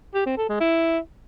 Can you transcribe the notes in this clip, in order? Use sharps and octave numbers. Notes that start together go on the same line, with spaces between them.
G4
C4
A4
G#3
E4